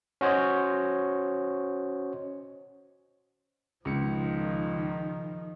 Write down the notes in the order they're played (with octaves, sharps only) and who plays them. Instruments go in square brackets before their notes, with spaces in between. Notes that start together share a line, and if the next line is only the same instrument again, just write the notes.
[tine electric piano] C#4 F#4 C5 C#5 D#5
[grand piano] C#2 C#7 [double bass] D#3 F3